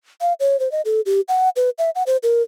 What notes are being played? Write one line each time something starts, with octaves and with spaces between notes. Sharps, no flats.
F5
C#5
C5
D#5
A4
G4
F#5
B4
E5
F#5
C5
A#4